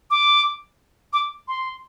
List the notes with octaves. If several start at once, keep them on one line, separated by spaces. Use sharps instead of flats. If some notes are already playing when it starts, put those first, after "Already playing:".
D6
D6
C6